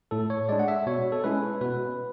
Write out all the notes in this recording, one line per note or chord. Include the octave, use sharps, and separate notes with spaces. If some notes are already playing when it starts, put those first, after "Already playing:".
A2 A4
C#5
G#3 D4 D5
F#5
E5
B2 C#5
A4
G#3 C#4 E4 B4
B2 B4